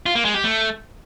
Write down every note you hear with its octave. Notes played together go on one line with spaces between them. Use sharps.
F4
A#3
G#3
G4
A3